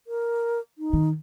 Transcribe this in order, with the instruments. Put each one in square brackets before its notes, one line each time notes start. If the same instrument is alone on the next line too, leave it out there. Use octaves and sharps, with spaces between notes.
[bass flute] A#4
D#4
[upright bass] D#3